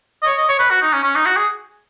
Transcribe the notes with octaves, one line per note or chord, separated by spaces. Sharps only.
D#5
C#5
D#5
C#5
B4
F#4
D#4
C#4
C#4
D#4
F#4
G#4